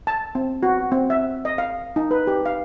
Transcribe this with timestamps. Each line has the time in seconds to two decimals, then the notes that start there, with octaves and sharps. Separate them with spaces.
0.07 A5
0.35 C4
0.63 F#4
0.92 C4
1.10 E5
1.45 D#5
1.58 F5
1.96 D#4
2.11 B4
2.27 G4
2.46 F5